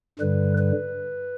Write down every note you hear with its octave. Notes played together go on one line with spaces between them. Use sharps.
G2 D3 G3 B4
B4